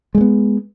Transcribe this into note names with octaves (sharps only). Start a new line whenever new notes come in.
G#3 A3 B3